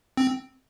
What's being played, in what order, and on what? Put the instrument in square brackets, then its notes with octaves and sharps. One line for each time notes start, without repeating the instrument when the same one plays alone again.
[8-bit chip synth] C4